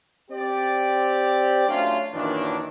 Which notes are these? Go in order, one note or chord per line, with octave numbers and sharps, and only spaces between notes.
C4 G4 D5
F#3 A3 C#4 D4 F4
F#2 A#2 D#3 E3 D4